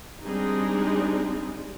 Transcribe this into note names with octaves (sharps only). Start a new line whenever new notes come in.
G3 G#3 C4 D4 D#4 G#4